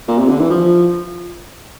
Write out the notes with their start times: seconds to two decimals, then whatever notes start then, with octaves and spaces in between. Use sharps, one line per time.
0.08 A#2
0.18 C3
0.29 D3
0.39 E3
0.50 F3